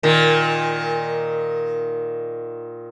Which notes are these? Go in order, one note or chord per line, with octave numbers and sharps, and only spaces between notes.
A#2 D#3